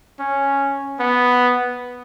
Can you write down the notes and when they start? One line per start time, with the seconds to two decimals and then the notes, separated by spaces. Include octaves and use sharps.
0.20 C#4
1.00 B3